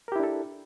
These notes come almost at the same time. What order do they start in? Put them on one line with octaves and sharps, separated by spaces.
A#4 G4 E4 D4 A4